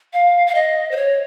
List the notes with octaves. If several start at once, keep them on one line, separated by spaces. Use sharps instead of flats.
F5
F5
D#5
C5
C#5